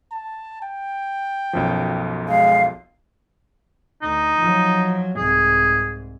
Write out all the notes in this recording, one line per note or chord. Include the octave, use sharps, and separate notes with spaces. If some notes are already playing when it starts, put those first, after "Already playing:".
A5
G5
B1 F#2 F3
G#3 F5
D2 D#4
F3 F#3
C2 G#2 G#4